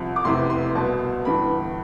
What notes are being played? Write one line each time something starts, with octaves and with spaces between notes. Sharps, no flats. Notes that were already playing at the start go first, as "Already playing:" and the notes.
Already playing: C2 C3 F3
D6
F1 E2 C3 E3 C6
C6
C2 B2 A5
G1 G2 E3 B5